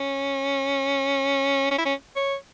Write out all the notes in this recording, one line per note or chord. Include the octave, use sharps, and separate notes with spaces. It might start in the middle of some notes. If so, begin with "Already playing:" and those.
Already playing: C#4
C#4
E4
C#4
C#5